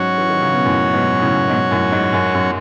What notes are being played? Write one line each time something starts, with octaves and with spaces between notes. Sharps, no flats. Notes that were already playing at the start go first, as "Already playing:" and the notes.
Already playing: G#2 F#3 C#4 F#4 C#5
E3
D#3
C#3
B2
F#2 A2
G#2 B2
A2 C#3
G#2 B2
F#2 A2
G#2
F#2
F#2